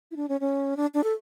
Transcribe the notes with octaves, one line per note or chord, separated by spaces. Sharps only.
E4
D4
C#4
C#4
D4
D4
A4